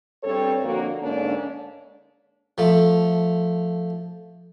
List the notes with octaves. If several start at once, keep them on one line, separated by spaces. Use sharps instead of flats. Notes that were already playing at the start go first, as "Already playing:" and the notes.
G2 C4 A4 C#5
F2 D3 A#3 F#4
G#2 D3 A#3 C#4 D4
F3 A3